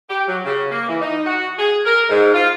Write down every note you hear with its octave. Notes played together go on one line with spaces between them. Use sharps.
G4
F#3
C#3
A#3
E3
D#4
F#4
G#4
A#4
G#2
F4